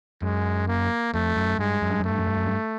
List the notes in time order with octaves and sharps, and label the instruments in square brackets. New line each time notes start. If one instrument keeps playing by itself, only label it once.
[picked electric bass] F#2 [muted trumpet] G#3
[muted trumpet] A#3
[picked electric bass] F2 [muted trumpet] A3
[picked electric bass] F#2
[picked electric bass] G2 [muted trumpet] G#3
[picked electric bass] F#2
G2
F#2
[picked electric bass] G2 [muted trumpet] A3
[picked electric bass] F#2
G2
F#2
G2